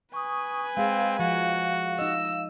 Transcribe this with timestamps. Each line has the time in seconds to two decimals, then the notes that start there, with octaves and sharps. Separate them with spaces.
0.14 B4 G#5 C#6 D#6
0.77 G#3 C4 G#4 F5
1.19 F3 F#4
1.99 D#4 D#5 E6